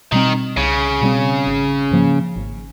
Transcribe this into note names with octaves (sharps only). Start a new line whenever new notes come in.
B2 D#3 G3 C4
C2 C#3
B2 G3 C4
G#1
G#2 F3 A#3
G#1